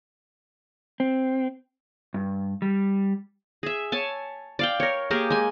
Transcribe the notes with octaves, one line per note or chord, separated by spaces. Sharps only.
C4
G2
G3
G#4 E5
C#5 G#5 A5
D5 F5 G5
A#4 C#5
A#3 G4 G#4 A#4
G#3 G#5